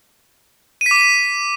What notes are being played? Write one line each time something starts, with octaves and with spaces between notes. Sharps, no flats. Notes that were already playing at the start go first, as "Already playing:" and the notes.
D#7
B6
D6
D#7
B6